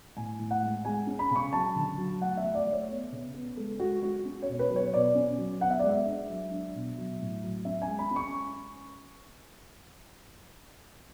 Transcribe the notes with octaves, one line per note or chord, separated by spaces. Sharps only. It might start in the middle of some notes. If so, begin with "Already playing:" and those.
A2 G#5
A2
F#5
G#3
G#3 G#5
C#4
B5
C#3 C#6
F#3 A5
D3
F#3
A3 F#5
E5
A3
D5
A3
C#5
B3
C#3
B3
G#3 A4
G#3 F#4
G#3 F#4
C#4
C#5
B2
B4
F#3
C#5
B2 D5
C#4
F#3
B3 F#5
E5
G#3 D5
E5
D4
F#3
D4
B2
F#3
A2
F#3
C#4 E5
G#5
G#3
B5
C#4
C#6